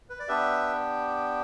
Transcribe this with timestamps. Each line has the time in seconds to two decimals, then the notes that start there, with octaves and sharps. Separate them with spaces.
0.10 B4
0.19 D5
0.28 B3 D4 G4 B4 E5